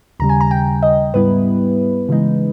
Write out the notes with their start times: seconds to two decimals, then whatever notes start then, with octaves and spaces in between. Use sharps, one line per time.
0.20 D#2 C#3 G3 A#5
0.29 G#5
0.41 A#5
0.51 G5
0.83 D#5
1.14 G#2 G3 B3 E4 B4
2.09 C#3 E3 G#3 D#4